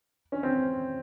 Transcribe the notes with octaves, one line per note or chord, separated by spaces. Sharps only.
C#4
C4